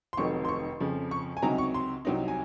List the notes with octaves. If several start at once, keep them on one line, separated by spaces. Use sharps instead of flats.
C6
F1 F2 D#3 F#3 C#6
C6
C#6
F2 C#3 F3
C#6
G#5
C#2 C3 F#3 C4 D#4 A#5
C#6
C6
C2 C3 F#3 C4 D#4
G#5